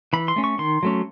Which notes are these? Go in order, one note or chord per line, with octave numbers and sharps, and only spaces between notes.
E3 B5
C6
A3 C#4
C#6
D#3 C6
F#3 A3 C#4